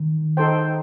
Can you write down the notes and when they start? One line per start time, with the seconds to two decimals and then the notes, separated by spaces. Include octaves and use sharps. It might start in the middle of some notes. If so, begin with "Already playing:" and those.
Already playing: D#3
0.37 D#4 A4 C5 G5